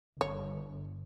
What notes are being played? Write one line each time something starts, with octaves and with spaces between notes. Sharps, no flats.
G1 C#5